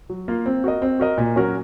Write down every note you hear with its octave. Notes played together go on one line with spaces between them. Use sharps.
F#3
A#3 F4
C4
F#4 A#4 D#5
C4
F#4 A#4 D#5
A#2
F#3 C#4 F#4 A#4